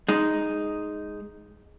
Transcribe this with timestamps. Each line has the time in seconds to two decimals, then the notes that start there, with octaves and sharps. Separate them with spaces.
0.09 G#3 D#4